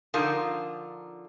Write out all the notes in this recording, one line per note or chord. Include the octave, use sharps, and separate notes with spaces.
D3 F3 D#4 F4 A#4 A5